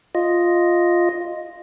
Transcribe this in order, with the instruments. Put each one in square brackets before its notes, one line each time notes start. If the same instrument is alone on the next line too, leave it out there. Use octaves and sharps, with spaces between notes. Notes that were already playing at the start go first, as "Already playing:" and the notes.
[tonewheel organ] F4 D#5